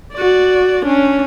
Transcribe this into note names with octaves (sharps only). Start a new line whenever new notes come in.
F#4 D5
C#4 D4